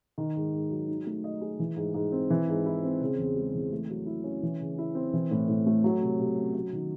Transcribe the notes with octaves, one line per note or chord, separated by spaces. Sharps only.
D#3
G#2
G#2
F#3
D#4
A3
D#5
G#4
E3
G#2
G#2
C4
E3
G#2
E4
C4
C#3
E2
G#3
E3
A3
F#3
E4
C#4
E3
C#3
E4
C4
E3
A2
A2
A3
F#3
C3
C3
C#4
F#3
D#3